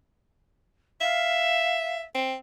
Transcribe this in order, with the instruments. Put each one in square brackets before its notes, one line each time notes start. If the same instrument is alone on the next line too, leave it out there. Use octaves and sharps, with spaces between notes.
[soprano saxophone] E5 [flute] F5
[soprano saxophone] C4